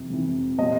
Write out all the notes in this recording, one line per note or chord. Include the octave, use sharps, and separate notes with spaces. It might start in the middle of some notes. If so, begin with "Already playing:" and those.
Already playing: F2 C3 E3
F2 C3 E3
A#2 G3 B3 D#5